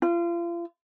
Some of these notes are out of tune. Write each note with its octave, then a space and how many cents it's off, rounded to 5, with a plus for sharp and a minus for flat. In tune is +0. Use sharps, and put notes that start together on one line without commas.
F4 -35